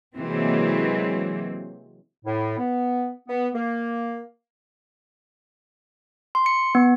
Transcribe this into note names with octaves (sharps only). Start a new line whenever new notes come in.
C3 E3 F#3 G#3 A#3 C4
A2
B3
B3
A#3
C6
C#7
B3